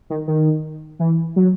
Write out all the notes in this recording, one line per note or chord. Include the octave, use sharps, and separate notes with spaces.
D#3
D#3
E3
F#3